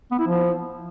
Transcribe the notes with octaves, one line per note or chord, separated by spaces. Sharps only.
B3
E4
F3